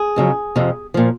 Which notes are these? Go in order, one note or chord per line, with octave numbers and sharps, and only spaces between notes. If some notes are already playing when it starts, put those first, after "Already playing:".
Already playing: G#4
F2 C#3 F#3
F2 C3 F3
A#2 F3